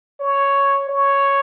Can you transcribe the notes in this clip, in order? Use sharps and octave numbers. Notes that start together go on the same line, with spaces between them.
C#5
C#5